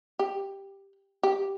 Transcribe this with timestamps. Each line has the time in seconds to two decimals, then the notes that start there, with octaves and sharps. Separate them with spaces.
0.19 G4
1.23 G4